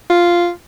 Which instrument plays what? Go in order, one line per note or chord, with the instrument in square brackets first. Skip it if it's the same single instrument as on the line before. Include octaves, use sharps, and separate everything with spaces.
[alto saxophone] F4